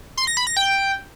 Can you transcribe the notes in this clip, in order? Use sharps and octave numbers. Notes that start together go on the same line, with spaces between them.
C6
A#6
B5
A#6
G5